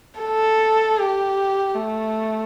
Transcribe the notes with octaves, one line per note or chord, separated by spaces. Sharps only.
A4
G4
A3